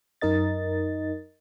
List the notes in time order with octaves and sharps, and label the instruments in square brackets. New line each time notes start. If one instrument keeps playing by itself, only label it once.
[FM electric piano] F#2 D#4 A#4 D#5 A6